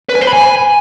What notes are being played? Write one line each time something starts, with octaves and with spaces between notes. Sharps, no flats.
B4
G#5
C5
B5
G#5